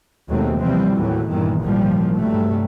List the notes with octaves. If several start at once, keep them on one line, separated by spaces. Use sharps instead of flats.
D#2 B2 F#3 G#3 A3 C4
C3 E3 F3 G3 C4
D#2 A2 E3 F#3 G3
E2 G2 A#2 D#3 E3
G#1 D#2 A#2 E3 F3 G3
G2 C3 F#3 G3 A3